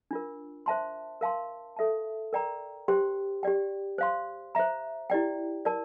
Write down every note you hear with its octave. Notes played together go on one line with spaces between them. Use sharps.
D4 F4 A#4
C5 E5 A5 C6
A#4 F5 A5 C6
A4 E5 A5
A#4 D5 G5 A#5
G4 C5 G5 C6
G4 D5 G5
C5 F5 C6
C5 E5 A#5
E4 G4 D5 G5
A#4 D5 A5